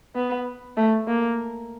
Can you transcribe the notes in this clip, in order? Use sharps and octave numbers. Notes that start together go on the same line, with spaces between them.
B3
A3
A#3